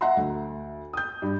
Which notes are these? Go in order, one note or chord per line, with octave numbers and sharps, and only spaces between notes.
D#5 E5 F#5 A#5 C6
D2
D#6 G6
G2